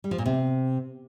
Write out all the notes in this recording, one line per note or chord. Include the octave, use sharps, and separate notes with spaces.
G3
F3
A#2
C3